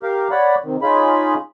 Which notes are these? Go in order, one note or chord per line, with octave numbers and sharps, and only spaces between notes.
G4 A#4 F5
C#5 D5 F#5 B5
C3 D#3
C#4 D#4 F4 G#4 B5